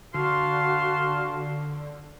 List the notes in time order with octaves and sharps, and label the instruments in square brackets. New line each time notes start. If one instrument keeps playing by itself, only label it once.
[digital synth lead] D3 [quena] F#4 [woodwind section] F5 A5 C6